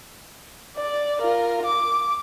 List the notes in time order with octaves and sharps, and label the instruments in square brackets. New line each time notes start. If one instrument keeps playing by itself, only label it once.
[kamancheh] D5
F4 A#4
D6